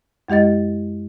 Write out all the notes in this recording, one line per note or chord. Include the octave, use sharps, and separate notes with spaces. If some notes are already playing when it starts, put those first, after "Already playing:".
F#2 G#3 G4 D#5 A6